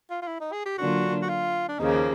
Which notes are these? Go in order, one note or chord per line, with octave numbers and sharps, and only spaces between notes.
F4
F4
E4
D#4
G#4
G4
D3 F#3 A#3 D4 F4 F#4
F#4
F4
D4
D#2 C#3 F3 A#3 D#4